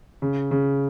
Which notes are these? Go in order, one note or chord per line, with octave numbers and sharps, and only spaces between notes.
C#3
C#3